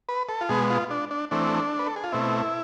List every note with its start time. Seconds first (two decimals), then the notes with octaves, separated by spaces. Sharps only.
0.09 B4
0.29 A4
0.41 F4
0.49 B2 G#3 B3 G#4
0.70 F4
0.91 D4
1.11 D4
1.31 E3 A3 C4 D4
1.79 B4
1.86 A4
1.96 G#4
2.04 F4
2.12 B2 A3 C4 E4